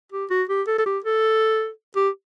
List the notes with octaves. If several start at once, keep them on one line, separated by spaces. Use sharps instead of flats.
G4
F#4
G4
A4
A4
G4
A4
G4